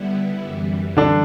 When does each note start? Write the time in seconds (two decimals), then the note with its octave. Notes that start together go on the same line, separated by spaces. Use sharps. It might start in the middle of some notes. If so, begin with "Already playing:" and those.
Already playing: D3 G3 B3 E4
0.43 F#2 E3 G3
0.97 D3 D4